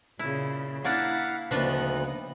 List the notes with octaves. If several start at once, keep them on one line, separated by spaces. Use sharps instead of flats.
A#2 C#3 E4
A#3 D4 E4 D5 F5 F#5
D2 C#3 F3 A#3 B3 D4 D#4 F#6